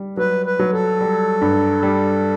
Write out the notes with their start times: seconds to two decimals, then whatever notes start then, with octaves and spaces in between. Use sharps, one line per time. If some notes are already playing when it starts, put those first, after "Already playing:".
Already playing: G3
0.17 F#3 B4
0.46 B4
0.59 F#3
0.72 A4
1.01 G3
1.41 G2
1.83 G3